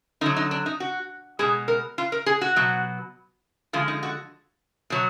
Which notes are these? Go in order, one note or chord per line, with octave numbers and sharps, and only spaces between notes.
D3 F#3 D#4
D#4
D4
D#4
F#4
B2 G#3 G#4
A#4
F4
A#4
G#4
F#4
B2 F#3
D3 F3 G#3 F4
D#4
F#4
B2 F#3